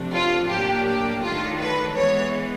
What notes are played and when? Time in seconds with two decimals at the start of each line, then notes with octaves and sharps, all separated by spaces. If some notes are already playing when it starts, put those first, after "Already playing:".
Already playing: C3 F3 A3 D4
0.13 F4
0.49 A2 F#3 A#3 D4 G4
0.87 G4
1.22 D#3 F#3 A3 D4 F4
1.60 B4
1.95 E3 G#3 B3 C#5